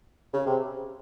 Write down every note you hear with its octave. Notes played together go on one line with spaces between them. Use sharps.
C#3
C3